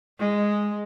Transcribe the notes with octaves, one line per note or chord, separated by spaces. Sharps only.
G#3